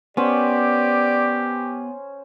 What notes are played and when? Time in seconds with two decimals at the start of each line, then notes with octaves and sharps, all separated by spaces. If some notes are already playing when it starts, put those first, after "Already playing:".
0.17 B3 C#4 G4 C5 D5